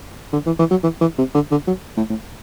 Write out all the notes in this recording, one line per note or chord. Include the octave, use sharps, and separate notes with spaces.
D3
E3
E3
F#3
E3
E3
C3
D3
D3
F#3
A2
A2